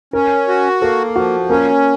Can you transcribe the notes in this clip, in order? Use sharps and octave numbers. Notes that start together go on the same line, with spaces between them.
C#4 A#4
F#4
A#3 A4
F3 F#4
A#3 C#4